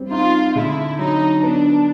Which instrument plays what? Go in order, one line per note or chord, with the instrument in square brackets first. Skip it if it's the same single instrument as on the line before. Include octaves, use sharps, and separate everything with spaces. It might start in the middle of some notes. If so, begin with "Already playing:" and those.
Already playing: [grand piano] G3 C4
[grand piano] D#4 [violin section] F4
[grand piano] D3 [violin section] E4
[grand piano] F#3 [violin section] D#4
[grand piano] B3 [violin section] D4